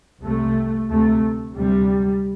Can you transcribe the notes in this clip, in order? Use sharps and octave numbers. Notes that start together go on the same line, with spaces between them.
C2 C3 A3
D2 C3 A3
D2 C3 G3